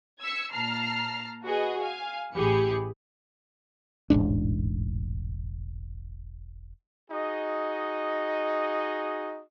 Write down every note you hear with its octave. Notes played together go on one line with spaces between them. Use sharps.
E6 G#6 B6 C#7
A#2 A5 A#5 F6 C7
F#4 G#4 B4 D#5
F5 G#5
A1 E3 G4 G#4 B5 C#7
E1 A1 G#2 D4
D#4 F#4 G#4 D#5